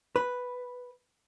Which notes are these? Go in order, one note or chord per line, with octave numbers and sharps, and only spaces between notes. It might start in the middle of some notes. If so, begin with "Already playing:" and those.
B4